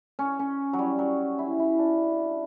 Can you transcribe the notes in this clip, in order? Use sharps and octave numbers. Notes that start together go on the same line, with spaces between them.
C#4
C#4
F#3
G3
F#3
E4
E4
D4